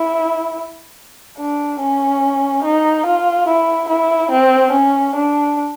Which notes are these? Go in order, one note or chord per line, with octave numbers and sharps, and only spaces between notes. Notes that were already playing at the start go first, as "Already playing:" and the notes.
Already playing: E4
D4
C#4
D#4
F4
E4
E4
C4
C#4
D4